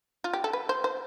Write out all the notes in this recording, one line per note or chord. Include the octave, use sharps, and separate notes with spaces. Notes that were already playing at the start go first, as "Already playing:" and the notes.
F4
G4
A4
B4
C5
C5